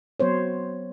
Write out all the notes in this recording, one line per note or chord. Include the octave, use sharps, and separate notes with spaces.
F#3 B3 C5 C#5